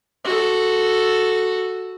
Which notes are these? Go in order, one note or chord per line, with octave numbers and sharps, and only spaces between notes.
F#4 A4